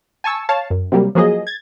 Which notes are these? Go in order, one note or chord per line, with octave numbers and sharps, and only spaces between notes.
G#5 A5 C#6 E6
C#5 F5 A5
F#2
C3 F#3 G3 A#3
F3 F#3 A#3 G#4 D#5
G#6 A6